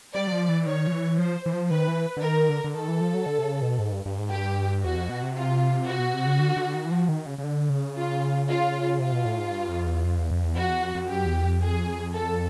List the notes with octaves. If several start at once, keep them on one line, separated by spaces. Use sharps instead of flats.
G3 D5
F#3
F3
E3
D#3 C#5
F3
E3
F3 C5
E3
F3
D#3 B4
E3
D3
D#3 A#4
D3
D3
D#3 A4
E3
F3
F#3
D3
C3
C#3
B2
G#2
G2
G2
G#2
G2 G4
E2 F#4
F2
B2
C3
F4
F#4
B2
C3
C#3
D3
D3
D#3
E3
F3
D#3
C#3
C#3
D3
C#3
F4
F4
C3 F4
B2
A2
G#2
G2
F2
E2
F2
E2
F2
E2
F2 F#4
E2
F2
F2
F#2 G4
E2
F2
G#4
A4